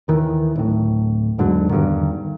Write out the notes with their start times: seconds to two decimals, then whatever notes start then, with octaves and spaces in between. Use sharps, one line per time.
0.08 D#2 D#3 E3
0.56 D1 A2
1.38 E2 G#2 D3 F#3
1.70 E2 G2 D3 D#3